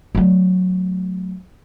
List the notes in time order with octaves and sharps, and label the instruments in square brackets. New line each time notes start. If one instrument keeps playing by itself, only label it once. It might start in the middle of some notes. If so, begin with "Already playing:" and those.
[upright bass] F#3 A3